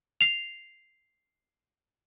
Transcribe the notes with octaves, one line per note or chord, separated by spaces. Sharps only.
C7 F7